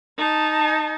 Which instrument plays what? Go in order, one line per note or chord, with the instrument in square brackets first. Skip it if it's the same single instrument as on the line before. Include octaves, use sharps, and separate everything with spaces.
[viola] D#4 A5